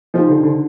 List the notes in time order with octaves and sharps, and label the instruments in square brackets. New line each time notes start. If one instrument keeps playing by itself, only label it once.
[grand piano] F3 [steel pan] D#4 G4 C5 D#5
[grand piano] D3
D3